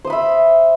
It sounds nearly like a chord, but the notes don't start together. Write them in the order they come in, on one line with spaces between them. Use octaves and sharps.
C5 D#6 B5 E5